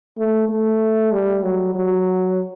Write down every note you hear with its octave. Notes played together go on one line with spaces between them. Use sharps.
A3
A3
G3
F#3
F#3